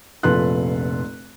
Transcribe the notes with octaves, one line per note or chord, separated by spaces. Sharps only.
F1 A#1 A4 B4 C6 F#6